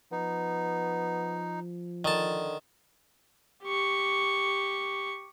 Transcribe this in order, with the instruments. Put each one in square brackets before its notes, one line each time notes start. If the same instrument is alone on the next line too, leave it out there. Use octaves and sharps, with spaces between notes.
[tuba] F3 [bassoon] B3 [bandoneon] D#4
[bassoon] D3 [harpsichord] D#3 A5
[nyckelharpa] G4 C#6